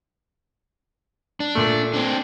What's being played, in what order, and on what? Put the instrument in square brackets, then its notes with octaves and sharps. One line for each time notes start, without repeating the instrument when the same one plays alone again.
[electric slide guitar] D4
[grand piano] A#2 A3
[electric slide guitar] C4 D4